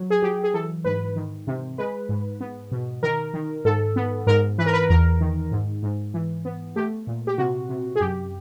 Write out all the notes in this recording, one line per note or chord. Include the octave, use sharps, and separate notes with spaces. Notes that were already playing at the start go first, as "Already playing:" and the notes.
Already playing: F#3
G#4
F#3 G4
G#4
E3 A4
G#2 B4
D#3
C3
G#3 B4
G#2
B3
B2
D#3 A#4
D#3
G#2 A4
B3
G#2 A#4
E3 B4
A#4
B4
E2 A#4
D#3
G#2
G#2
E3
B3
A3 G4
A#2
G4
C3 F#4
C3
G#4
F#2 G4